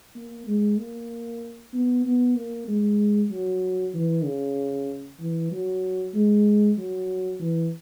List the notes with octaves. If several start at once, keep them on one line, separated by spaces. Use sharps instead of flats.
A#3
G#3
A#3
B3
B3
A#3
G#3
F#3
E3
C#3
E3
F#3
G#3
F#3
E3